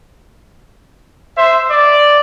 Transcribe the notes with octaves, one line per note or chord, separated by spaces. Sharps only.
C5 E5
D5